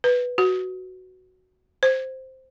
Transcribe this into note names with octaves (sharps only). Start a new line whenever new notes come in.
B4
F#4
C5